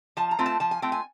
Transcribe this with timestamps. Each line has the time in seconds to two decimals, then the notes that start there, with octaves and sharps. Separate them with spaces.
0.17 F3 A5
0.31 A#5
0.39 A3 C4 F4
0.46 A5
0.60 F3 A5
0.71 G#5
0.82 A3 C4 F4 G5
0.92 G#5